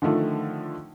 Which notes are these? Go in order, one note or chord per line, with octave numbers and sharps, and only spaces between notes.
D3 D#3 F3 A3